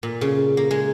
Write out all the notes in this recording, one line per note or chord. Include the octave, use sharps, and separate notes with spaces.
A#2
C#3
A#3
G#3